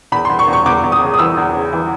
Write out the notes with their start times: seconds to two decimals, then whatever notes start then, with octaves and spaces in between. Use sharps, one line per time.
0.12 E2 B5
0.25 C6
0.29 E2
0.39 C#6
0.48 E2
0.53 C#6
0.66 E2 D6
0.84 E2
0.92 D#6
1.02 C#3
1.14 D#6
1.19 E3 E6
1.37 E2
1.55 C#3
1.73 E3